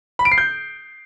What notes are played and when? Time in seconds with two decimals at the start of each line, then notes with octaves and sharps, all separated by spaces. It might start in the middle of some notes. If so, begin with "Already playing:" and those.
0.19 B5
0.25 D7
0.31 C7
0.38 G6